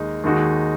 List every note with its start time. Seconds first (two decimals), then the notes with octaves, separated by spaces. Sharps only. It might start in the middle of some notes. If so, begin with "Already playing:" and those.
Already playing: D#2 G#3 D#4
0.24 D#2 D#3 G#3 D#4 F#4